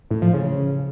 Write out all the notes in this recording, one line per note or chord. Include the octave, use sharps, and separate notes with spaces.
A2
F3
C#3